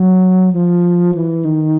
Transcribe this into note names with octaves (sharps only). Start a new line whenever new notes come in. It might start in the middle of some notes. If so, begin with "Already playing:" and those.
Already playing: F#3
F3
E3
D#3